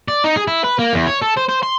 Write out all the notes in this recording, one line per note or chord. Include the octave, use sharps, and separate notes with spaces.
D5
D#4
G#4
E4
B4
A#3
E2
C#5
A4
C5
C5
C6